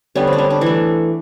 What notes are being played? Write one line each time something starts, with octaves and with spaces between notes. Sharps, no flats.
D3 G3 B3 C#4
C4
D4
C#4
D4
E3
A3